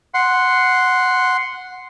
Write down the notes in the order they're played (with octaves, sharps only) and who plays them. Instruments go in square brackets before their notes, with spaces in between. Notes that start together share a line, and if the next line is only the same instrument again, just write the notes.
[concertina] F#5 C6